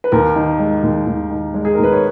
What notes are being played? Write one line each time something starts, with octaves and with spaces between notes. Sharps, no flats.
B4
D#2 A#4
D#3
G#3
D#2
D#2
D#3
G#3
G#4
D#2 A#4
B4
C#5